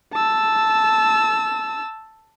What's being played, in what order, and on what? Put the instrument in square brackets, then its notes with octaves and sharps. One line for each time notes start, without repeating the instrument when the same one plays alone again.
[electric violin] A5 E6